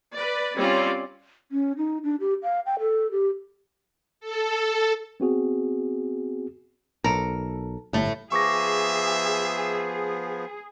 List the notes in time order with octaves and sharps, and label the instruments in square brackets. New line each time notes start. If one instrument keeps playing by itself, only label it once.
[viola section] B4 D5
G3 C4 C#4 F4 D5
[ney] C#4
D#4
D4
G4
F5
G5
A4
G4
[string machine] A4
[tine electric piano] B3 C4 F#4 G#4
[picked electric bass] B1 [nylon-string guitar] A4 A#4
[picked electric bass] G1 [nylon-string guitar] A2 A3
[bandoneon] F3 B3 [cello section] G#4 [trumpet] E5 [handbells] C#6 D6 A#6